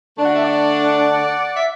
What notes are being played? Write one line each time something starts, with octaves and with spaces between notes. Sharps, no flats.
D3 A3 D4
F#5
E5
D5 F#5
E5